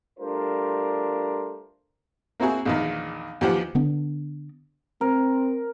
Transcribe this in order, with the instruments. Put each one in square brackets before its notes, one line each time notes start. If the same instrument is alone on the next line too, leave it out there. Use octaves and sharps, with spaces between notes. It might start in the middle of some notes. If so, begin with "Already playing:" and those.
[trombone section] G3 A3 D4 F4 A#4 C5
[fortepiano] A#3 C4 E4 F#4 G#4
A#1 E2 D#3
D#2 E3 F3 G4 C5 F#5
[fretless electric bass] D3 B3 D4
[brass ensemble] C4 [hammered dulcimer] A#4